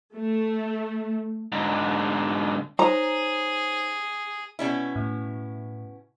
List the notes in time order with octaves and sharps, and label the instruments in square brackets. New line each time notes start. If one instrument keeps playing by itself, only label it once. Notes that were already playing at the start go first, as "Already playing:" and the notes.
[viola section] A3
[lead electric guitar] G#2 D3
[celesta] D#4 C5 C#5 [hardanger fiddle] G#4 [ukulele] A#5
[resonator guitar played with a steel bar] B2 C#4 E4
[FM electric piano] A2